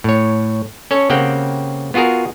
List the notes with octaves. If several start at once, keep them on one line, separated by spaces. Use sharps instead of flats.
A2 C#5
C#4 A4 C#5
C#3 A#3 C4 G4 F#5 G5
B3 F4 F#4 G#4 A#4